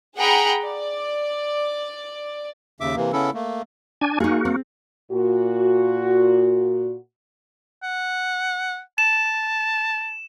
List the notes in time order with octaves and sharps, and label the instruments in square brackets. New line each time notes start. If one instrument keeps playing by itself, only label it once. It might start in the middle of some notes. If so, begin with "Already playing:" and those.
[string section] G#4 F#5 G5 A#5 B5
D5
[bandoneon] D#2 C#3 E5 D6
C3 E3 A#3
C#3 B3 C#4 E4 A4
A3 A#3
[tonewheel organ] D4 G#5
[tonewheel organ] A#3 F#4 [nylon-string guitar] D#4 G#4
[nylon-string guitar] C4
[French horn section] A#2 F#4
[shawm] F#5
[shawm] A5 [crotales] E7